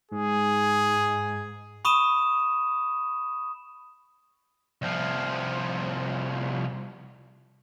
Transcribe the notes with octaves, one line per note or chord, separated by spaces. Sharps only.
G#2 G#4
B5 C#6 D#6 D#7 E7
C2 F3